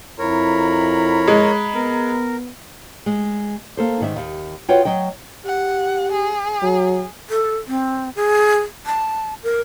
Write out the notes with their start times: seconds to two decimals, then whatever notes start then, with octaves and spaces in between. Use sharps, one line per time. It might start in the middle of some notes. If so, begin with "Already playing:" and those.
0.19 F2 E4 A#4 C#5 A#5 B5
1.28 G#3
1.74 B3 A#4
3.06 G#3
3.77 A#3 A4 C5
4.01 G#2 D#3 A4 E5
4.16 D#2
4.68 F4 F#4 B4 C#5 F#5 G5
4.85 F#3 D#5 G5
5.46 G4 F#5
6.12 G#4
6.62 F#3
7.30 A4
7.68 C4
8.16 G#4
8.86 A5
9.43 A#4